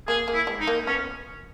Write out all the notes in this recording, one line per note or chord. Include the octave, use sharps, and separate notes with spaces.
A#3 G#4
A#3
E4
G#3
D#4
A#3
B3 C#4